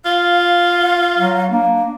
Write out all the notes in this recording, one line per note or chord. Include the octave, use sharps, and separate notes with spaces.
F4 F5
F#3
A#3 D4